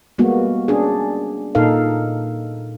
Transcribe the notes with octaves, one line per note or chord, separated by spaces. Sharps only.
G3 G#3 A#3 B3 F#4
C#4 D4 G#4
A#2 D#4 A4 A#4 F5